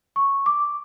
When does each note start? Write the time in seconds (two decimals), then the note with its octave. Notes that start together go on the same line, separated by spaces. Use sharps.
0.16 C#6
0.46 D6